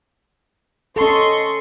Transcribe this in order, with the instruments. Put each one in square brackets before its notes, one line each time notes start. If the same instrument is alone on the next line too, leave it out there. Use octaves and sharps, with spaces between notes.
[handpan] C#4 A4 [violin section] D#5 C6 C#6